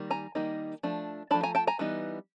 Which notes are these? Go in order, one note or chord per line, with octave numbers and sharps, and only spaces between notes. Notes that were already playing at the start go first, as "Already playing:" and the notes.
Already playing: D#3 G3 A#3
G#5 A#5
D#3 G3 A#3 D#4
F3 A3 D4
F3 A3 D4 A5 B5
G#5 A#5
G5 A5
G#5 A#5
E3 G3 B3 D#4